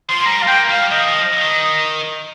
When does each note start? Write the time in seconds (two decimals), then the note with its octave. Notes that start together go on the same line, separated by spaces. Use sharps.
0.09 F3 C6
0.19 A#3
0.25 G3 A#5
0.42 F5
0.47 A#3 G5
0.70 G3 F5
0.92 D#3 D#5
1.08 F3
1.42 D#3